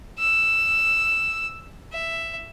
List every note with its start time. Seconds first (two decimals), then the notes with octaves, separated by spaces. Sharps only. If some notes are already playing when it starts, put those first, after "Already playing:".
0.19 E6
1.92 E5